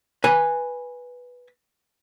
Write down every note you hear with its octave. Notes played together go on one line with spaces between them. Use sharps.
B4 G#5